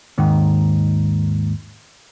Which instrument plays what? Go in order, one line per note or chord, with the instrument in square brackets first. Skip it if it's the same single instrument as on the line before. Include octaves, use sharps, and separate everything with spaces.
[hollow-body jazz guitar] D#2 G#2 D#3